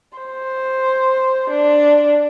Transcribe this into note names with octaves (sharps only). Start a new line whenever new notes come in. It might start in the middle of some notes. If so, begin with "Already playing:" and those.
C5
D4